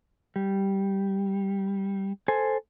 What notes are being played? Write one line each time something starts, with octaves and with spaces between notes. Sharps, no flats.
G3
A4 C5 G#5